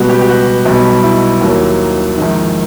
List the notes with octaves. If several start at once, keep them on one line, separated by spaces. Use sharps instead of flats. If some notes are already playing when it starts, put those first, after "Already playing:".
Already playing: C#2 B2 G3 B3 F#4
G4
G4
F#4
B1 B2 G3
E4
D#2 D#3 F#3 A#3
A#1 G#2 D#3